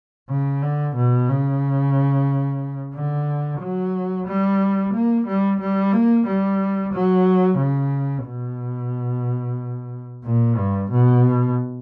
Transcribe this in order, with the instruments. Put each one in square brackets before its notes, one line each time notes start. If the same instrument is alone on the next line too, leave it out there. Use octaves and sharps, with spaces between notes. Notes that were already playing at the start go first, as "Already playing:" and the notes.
[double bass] C#3
D3
B2
C#3
D3
F#3
G3
A#3
G3
G3
A#3
G3
F#3
C#3
B2
A#2
G2
B2